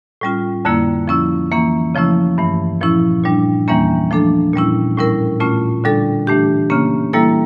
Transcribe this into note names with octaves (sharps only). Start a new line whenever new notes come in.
A2 G3 C#4 F4
F2 D3 G3 A#3 E4
F3 C#4 E4
E3 A#3 C#4
C#3 F3 A3 C#4 E4
G2 E3 A3
A#2 F3 C#4 E4
A#2 G3 D4
E2 E3 G3 A#3 C#4
F3 A3 D4 A4
A#2 G3 C#4 E4
A2 G3 C#4 E4 A#4
A#2 A3 C#4 F4
D3 G3 D4 A4
E3 A3 D4 G4
C#3 E3 A#3 C#4
E3 G3 A#3 E4 A4